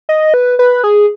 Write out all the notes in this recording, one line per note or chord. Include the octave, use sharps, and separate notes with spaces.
D#5
B4
B4
G#4